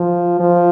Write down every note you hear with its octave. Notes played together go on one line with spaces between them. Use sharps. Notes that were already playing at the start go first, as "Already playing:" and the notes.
Already playing: F3
F3